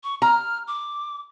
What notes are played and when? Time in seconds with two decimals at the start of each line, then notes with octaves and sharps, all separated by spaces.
0.04 C#6
0.22 A#5 F6
0.68 D6